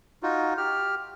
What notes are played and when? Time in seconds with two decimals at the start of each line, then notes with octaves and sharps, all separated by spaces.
0.23 D#4 F4 F#4
0.57 G4 F6